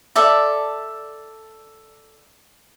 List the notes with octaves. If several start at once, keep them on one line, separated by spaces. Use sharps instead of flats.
A4 D5 E5